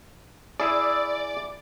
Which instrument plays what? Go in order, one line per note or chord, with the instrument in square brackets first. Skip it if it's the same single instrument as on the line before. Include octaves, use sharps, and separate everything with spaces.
[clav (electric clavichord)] E4 G#4 [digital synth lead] D5